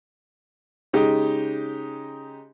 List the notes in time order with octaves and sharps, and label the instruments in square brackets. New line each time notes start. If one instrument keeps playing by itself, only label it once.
[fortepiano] C#3 G#3 D#4 G4